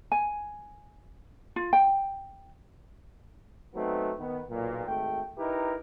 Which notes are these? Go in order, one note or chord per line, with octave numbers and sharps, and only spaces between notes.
G#5
F4
G5
F#3 A3 B3 C4 D#4
D#3 B3
B1 A#2
G#1 A3 G5
D#4 E4 G4 A#4 B4